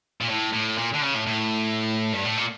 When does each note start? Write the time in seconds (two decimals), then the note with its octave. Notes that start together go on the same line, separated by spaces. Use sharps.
0.21 A#2
0.29 A2
0.53 A2
0.78 A#2
0.94 D3
1.02 C#3
1.14 A2
1.27 A2
2.13 G2
2.24 A2
2.37 A#2